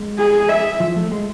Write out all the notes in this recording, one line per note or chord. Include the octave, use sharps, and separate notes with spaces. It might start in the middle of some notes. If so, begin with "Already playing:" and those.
Already playing: G#3
G#4
E5
F3
A3
G#3